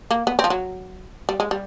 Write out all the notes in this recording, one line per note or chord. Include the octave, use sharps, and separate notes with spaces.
A#3
B3
C4
F3
F#3
G3
G#3
G3